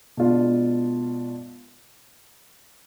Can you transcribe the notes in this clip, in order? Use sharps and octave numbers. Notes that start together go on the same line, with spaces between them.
B2 G#3 B3 D4 F4